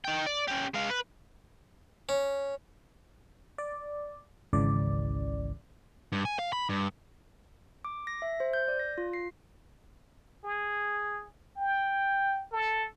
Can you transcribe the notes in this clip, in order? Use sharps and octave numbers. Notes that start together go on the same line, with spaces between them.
D#4 G5
D5
C#4 G4
G#3 F5
B4
C#4
D5
G#1 C#2 C#3 E3 D5
G2
G#5
F5
B5
G2
D6
A#6
E5
C5
G6
D5
A#6
F4
C7
G#4
G5
A4